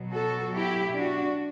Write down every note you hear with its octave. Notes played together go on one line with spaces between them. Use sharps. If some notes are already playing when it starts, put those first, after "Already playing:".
Already playing: B2 F#3
F#4 A4
E4 G4
D4 F#4